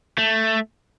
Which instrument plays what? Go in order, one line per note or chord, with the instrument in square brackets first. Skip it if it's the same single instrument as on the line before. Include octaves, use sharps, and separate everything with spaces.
[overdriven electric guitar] A3